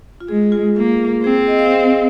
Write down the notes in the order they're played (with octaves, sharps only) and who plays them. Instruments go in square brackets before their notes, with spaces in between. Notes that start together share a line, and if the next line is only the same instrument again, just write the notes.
[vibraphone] F4
[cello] G#3 [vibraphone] G#4
[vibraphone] F4
[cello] A#3 [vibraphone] F4
[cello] C4 [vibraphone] G#4
[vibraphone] C5
D#5
F5